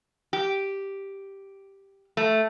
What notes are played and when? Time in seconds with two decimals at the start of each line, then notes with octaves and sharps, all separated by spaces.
0.33 G4
2.17 A3